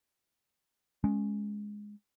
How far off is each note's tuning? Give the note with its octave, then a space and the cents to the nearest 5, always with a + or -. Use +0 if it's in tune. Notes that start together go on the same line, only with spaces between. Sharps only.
G#3 +0 C#4 +0